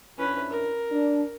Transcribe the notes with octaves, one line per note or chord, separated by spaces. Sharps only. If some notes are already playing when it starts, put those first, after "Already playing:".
F2 C#4 D4 E4 B4
A#4
D4